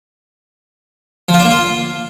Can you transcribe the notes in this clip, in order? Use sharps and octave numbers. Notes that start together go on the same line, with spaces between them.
F3
F4
D4
A#3
F4